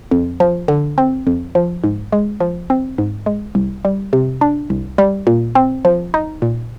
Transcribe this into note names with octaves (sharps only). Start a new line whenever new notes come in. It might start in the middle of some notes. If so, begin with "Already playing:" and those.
F2
F3
D3
C4
F2
F3
G#2
G#3
F3
C4
G#2
G#3
C2
G3
C3
D4
C2
G3
A#2
C4
F3
D#4
A#2